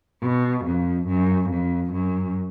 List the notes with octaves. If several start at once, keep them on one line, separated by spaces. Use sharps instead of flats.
B2
F2
F#2
F2
F#2